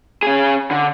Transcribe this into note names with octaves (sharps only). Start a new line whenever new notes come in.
C#4 G#4
D3